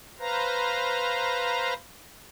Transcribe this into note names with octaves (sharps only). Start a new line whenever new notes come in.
B4 C5 F5 A#5